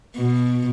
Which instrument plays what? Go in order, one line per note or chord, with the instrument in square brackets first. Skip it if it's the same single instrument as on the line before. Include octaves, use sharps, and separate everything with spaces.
[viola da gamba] B2